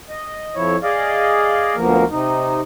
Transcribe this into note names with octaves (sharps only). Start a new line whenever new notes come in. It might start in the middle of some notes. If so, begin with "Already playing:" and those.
D#5
F2 F3 E4 C#5
G#4 D5 D#5 F5
D2 B2 F3 A#3 A#4
C3 D#4